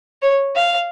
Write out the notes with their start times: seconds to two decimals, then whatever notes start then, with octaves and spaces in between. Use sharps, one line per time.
0.22 C#5
0.56 F5